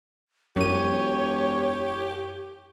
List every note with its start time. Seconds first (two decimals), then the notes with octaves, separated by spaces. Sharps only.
0.56 E1 F#2 G4 C#5 D#7